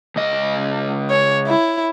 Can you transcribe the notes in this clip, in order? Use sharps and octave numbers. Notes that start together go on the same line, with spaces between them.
C#2 D#5
C#5
E4